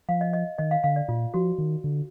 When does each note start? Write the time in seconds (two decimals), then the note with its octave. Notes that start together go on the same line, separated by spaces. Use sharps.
0.09 F3 F5
0.21 D#5
0.33 D#5
0.58 D#3 D#5
0.71 F5
0.84 D3 F5
0.96 D5
1.08 A#2 F4
1.34 F3 F#4
1.58 D#3
1.84 D3